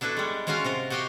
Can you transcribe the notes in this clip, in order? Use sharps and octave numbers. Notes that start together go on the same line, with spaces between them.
B3 D4 E4 F#4 A4
G3 G#3
G#3 C#4 F4 F#4 A#4 F5
C3 F4 A#4
F#4 G4 D#5 F5 G5